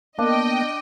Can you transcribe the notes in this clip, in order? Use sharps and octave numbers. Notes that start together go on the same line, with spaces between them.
A#3 B3 D4 D#5 G5